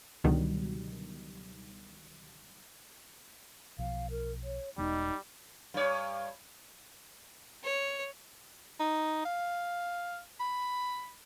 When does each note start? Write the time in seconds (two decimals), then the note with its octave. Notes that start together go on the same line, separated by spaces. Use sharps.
0.24 C#2 B2 D3 D#3 F#3 G3
3.79 B1 B2 F3 F5
4.11 A#4
4.43 C#5
4.78 E1 G3 G#3 B3 D#4
5.74 G2 C#5
7.64 C#5
8.80 D#4
9.25 F5
10.40 B5